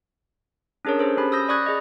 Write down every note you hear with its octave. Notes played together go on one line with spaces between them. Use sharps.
C#4 D4 G#4 A#4 C#5
G#4 A4 C5
C#4 G4 B5
D#6 E6 G6 A#6
D5 B5 C#6 D#6 F#6 G#6
G#4 D#5